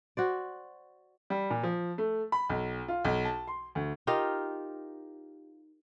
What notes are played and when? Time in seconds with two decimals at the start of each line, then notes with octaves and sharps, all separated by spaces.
0.17 F#4 C5 D5
1.30 G3
1.50 A#2
1.63 F3
1.98 A3
2.32 B5
2.49 B1
2.88 F4
3.05 B1
3.25 A5
3.48 C6
3.75 D2
4.07 D#4 F4 G4 A#4